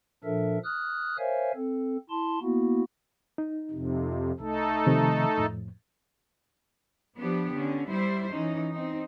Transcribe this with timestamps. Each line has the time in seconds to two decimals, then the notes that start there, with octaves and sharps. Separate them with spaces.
0.24 A#2 F3 D4 A4 A#4 E5
0.64 D#6 F6 F#6
1.18 A#4 C5 C#5 E5 F5 G#5
1.56 C4 A4
2.10 E4 A5 C6
2.42 A#3 B3 E4 F#4
3.38 D#4
3.71 F2 C3
4.40 C2 A3 D#4 A4
4.87 C3 D#3 F3
5.38 F2 A2 F3
7.17 F3 B3 D4 G4
7.53 D3 C#4
7.91 G3 E4 C5
8.31 E3 C#4 D#4
8.73 C4 D#4